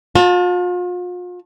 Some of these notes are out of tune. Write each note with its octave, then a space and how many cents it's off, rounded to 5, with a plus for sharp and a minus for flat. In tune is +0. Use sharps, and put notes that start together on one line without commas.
F4 +40 A5 +0